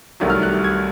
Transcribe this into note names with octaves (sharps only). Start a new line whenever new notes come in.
C2 C3 D#3 F#3 A3
F6
F#6
G#6